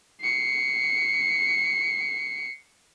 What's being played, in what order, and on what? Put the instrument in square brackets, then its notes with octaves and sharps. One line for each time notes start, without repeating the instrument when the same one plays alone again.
[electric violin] C7 C#7